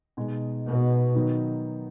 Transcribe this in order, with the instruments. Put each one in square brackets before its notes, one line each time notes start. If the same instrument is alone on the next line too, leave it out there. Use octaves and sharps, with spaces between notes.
[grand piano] B2 G#3 D#4
[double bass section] B2
[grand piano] D#3 F#3 B3 D#4